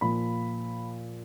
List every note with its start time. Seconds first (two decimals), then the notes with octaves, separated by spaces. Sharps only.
0.01 A#2 F3 B5